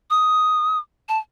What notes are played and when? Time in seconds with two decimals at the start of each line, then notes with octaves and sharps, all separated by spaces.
0.10 D#6
1.09 A5